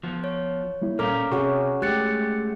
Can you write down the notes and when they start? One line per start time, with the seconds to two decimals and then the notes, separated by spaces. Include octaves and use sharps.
0.03 F3 B3
0.24 C#5
0.82 G3 A#3 E4
0.99 A#2 C#4 A4 A#4 F5 A#5 D6 F6
1.32 C3 C#4 F#4 G#4 F#5 C#6
1.82 G#3 A3 G4 F#6 A6 C#7